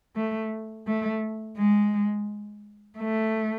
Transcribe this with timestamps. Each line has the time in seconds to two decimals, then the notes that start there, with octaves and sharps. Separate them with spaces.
0.16 A3
0.87 A3
1.58 G#3
2.98 A3